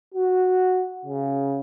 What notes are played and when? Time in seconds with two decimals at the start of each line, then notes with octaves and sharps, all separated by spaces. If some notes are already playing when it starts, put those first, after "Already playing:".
0.14 F#4
1.05 C#3